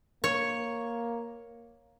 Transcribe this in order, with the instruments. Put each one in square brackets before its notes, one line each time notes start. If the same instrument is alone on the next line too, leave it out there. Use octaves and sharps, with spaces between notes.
[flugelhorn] A#3 [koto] C#5